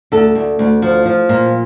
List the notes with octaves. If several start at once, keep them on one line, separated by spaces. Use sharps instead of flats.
D2 A4
D2
D2
F3
F3
A#2